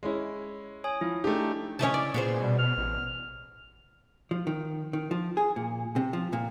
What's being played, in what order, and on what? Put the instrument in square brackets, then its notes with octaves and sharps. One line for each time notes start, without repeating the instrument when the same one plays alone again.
[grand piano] G#3 C#4 E4
[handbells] C#5 G#5 D#6
[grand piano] F3 [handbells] E4
[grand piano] A3 G4 [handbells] D4 D#4
[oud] C#3 E4 C#5 [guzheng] C#4 D#5 A5
[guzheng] D5
[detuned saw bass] A#2 [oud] B3 G#4 C5
[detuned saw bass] B2 [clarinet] G3
[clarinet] F6
[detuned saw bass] A1
[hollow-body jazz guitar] F3
D#3
D#3
F3
G#4
A#2
C3
F3
A#2